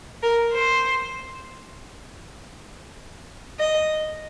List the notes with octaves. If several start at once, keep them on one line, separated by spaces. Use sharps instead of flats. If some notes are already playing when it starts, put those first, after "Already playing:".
A#4
C5
D#5